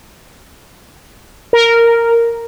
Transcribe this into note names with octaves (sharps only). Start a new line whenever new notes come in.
A#4